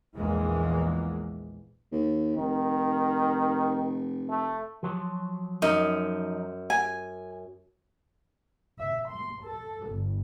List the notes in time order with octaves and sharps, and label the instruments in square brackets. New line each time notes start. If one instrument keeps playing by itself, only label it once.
[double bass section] A#1 E2 E3 G#3 A#3
[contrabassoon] D#2
[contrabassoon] F1 [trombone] D#3
[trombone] A3
[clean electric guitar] F3 F#3
[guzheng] F#2 [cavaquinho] D#4
[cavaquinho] G#5
[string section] E5
C6
A4
G1